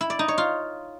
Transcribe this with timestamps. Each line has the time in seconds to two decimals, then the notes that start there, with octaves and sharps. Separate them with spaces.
0.01 E4
0.10 D5
0.19 D#4
0.28 C#5
0.38 F4